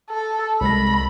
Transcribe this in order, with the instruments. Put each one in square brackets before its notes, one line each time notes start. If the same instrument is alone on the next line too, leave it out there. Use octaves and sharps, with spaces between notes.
[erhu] A4
[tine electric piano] C2 G#3 A#6 [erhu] B5